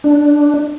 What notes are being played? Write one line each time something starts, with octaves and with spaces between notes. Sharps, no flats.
D4